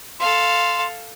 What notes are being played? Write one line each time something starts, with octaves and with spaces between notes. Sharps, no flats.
A4 F5 C6